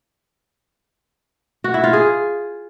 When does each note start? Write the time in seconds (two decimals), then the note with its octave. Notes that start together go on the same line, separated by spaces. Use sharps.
1.64 F#4
1.74 E4
1.84 F4
1.93 G#4